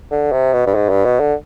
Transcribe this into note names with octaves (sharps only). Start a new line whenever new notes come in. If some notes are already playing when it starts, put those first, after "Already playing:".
D3
C3
B2
G2
G#2
G2
B2
D3